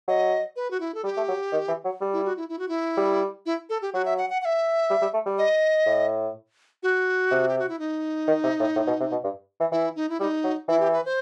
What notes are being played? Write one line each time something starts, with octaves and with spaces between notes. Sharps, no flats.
F#3 D#5
B4
F#4
E4
A4
G3 G4
A3
F#3
D#3
E3
F#3
G3
E4
F#4
E4
E4
F#4
E4
G3
E4
A4
G4
F#3 F#4
E5
F#5
F#5
F#5
E5
G3
G3
A3
G3
D#5
A2
F#4
C3
G4
F#4
E4
D#4
D#3
C3
A2
A2
B2
C3
B2
G2
E3
E3 E4
D#4
E4
G3 E4
D#4
F#3
E3 E4
G4
B4
C5